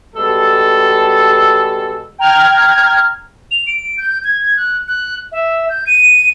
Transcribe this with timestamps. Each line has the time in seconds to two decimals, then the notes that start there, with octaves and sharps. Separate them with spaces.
0.15 B2 G3 G#3 A4
2.18 G5 A#5 F6 G#6
3.51 F7
3.67 D7
3.98 G6
4.24 G#6
4.57 F#6
4.88 F#6
5.32 E5
5.69 G6
5.87 D#7